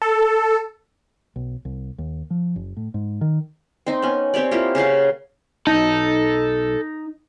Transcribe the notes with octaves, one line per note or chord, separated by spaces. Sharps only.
A4
B1
C2
D#2
F3
F#1
A2
G#2
D#3
C4 D#4
B3 C#4
C4 G4 C#5 D5
A#3 E4 F4 G4
C#3 G4 F5 F#5
B1 D#4 A4